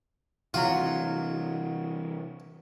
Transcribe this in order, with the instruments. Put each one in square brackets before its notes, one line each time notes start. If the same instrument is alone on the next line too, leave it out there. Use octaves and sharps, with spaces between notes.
[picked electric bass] C3 E3 [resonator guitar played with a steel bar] F#3 F#4 [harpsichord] F4